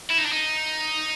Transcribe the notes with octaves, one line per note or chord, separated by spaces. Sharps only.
E4
D#4
D4
D#4